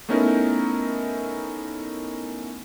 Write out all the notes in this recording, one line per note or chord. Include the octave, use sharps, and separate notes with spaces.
A3 B3 C#4 D#4 E4 A#4